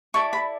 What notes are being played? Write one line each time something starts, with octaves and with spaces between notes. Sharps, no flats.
E4 A4 D5 C#6
B5